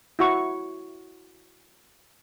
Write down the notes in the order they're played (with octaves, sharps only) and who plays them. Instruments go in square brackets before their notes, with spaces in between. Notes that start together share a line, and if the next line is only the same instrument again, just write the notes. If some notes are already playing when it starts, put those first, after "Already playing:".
[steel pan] E4 F#4 C#6